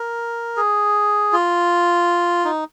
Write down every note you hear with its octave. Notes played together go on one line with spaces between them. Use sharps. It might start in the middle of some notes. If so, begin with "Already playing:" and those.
Already playing: A#4
G#4
F4
D#4